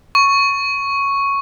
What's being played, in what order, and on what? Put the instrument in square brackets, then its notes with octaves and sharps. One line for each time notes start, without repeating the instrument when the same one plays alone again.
[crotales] C#6